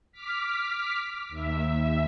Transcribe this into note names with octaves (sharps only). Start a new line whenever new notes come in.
D6 F6 B6
D#2 E5